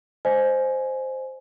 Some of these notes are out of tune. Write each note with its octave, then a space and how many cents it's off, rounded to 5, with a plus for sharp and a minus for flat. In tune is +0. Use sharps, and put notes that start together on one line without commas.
C5 +0 D#5 -15 G#5 +15